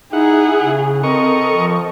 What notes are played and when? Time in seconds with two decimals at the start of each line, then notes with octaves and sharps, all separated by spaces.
0.13 D#4 E4 G#4 F#5
0.62 C#3
1.04 C4 A4 A#4 D#5 C#6
1.54 F3